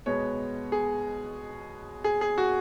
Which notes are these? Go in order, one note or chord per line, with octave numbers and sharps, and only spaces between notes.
B2 G#3 B3 C#5
G#4
G#4
G#4
F#4